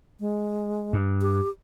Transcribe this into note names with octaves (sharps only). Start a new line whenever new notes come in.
G#3
G2
G4